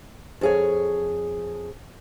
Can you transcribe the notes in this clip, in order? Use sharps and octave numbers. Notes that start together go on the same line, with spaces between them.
F2 G#4 C#5